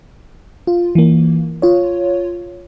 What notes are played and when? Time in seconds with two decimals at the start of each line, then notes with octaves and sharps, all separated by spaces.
0.67 F4
0.95 E3 A#3
1.62 F4 C#5